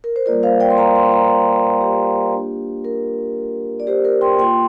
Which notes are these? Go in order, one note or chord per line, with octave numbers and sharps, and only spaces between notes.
A#4
C5
G3 A#3 F4 A#4 D5
C5 F5
D5 G5
C6
F5 A#5
G5 C6
F5 A#5
G4
A#3 D4 F4
A#4
D5
G4 C5
A#4
G5 C6
A#3 F4 G5 C6